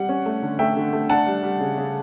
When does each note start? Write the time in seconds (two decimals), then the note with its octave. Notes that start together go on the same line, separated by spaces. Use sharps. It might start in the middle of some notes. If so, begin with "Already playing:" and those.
Already playing: G3 F#5
0.09 C#4
0.26 A3
0.42 D3
0.59 A3 E5 G5
0.77 D3
0.93 A3
1.09 D4 F#5 A5
1.26 G3
1.43 G3
1.60 C#3
1.78 C#3